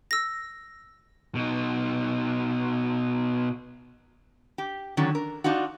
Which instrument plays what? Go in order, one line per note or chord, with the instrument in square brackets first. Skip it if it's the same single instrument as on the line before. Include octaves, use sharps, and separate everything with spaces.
[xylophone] E6 A#6
[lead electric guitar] B2 D#4
[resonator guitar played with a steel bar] G4
D3 D#3 F#3 C#4
A#4
D4 D#4 F4 F#4